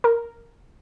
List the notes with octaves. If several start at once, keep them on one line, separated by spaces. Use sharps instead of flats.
A#4